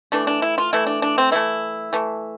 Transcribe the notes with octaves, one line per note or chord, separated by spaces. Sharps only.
E3 A3 D4
D4
E4
F4
E3 A3 E4
D4
D4
C4
E3 A3 E4
E3 A3